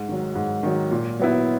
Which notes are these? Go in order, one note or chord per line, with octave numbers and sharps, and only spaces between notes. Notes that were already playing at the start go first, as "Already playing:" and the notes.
Already playing: G#2
D#3 F#3
G#2
D#3 F#3
A#2
F#3 B3 E4